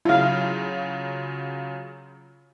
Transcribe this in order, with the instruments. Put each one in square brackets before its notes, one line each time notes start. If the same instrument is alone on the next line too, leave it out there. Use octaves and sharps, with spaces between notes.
[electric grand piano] C#3 F#3 F4 [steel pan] E4 F5